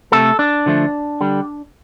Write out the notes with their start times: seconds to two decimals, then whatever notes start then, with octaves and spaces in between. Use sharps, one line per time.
0.12 C3 A3 A4
0.39 D4
0.66 D3 F3 A3
1.21 D3 G3